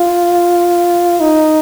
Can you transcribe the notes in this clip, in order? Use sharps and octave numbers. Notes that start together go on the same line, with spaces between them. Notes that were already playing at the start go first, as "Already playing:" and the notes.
Already playing: F4
D#4